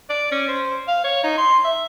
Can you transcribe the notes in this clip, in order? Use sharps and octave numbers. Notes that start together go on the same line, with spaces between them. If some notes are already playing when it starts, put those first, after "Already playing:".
D5
C#4
C5
F5
C#5
D#4
C6
E5